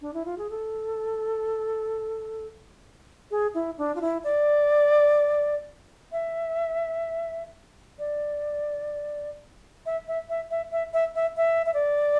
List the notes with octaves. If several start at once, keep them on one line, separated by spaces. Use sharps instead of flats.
D4
E4
F4
G#4
A4
G#4
E4
D4
F4
E4
D5
E5
D5
E5
E5
E5
E5
E5
E5
E5
E5
E5
D5